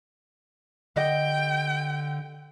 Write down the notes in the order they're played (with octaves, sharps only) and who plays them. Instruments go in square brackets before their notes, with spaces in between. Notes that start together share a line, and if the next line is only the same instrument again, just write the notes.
[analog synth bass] D3 [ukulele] G4 D#5 F#5 [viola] G5